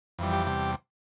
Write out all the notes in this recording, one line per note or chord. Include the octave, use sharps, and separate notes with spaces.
F2 E3 G3
G4
E2 C3 G3